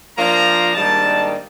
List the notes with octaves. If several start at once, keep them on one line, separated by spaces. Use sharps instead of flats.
F3 A#3 D4 F4 A#5
G#2 D#3 G3 A#3 D4 A5